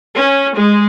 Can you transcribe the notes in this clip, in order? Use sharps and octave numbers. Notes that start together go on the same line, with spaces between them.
C#4
G#3